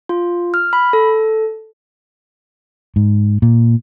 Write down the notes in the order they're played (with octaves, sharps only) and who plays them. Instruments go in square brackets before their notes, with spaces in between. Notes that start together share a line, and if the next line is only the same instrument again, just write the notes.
[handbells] F4
F6
B5
A4
[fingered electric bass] G#2
A#2